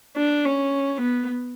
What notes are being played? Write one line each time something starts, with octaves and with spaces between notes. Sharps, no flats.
D4
C#4
B3